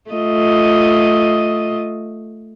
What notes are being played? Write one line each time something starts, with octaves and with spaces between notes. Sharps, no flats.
A3 F4 D#5